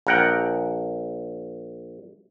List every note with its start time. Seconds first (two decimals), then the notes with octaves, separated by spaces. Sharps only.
0.07 A#1 A#4 F#5 G5